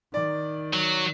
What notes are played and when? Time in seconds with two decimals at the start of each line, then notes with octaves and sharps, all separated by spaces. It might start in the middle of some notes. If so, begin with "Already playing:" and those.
0.14 D#3 D5
0.73 F#3